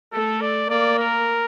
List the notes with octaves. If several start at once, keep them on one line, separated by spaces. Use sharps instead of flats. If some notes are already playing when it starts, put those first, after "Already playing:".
A3 A4
D5
A#3 D5
A#4